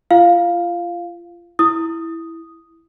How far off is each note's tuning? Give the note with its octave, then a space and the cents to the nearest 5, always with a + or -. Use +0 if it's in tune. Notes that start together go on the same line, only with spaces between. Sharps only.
F4 -25 F5 +0
E4 +0 D#6 +0